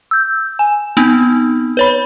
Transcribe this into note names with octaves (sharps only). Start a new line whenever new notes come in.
E6 G6
G#5
B3 C4 D#4
B4 C#5 B5